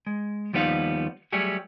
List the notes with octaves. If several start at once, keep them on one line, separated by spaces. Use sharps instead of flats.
G#3
D#2 F3 G3 B3 D#4 F5
F#3 G3 A3 G4 G#4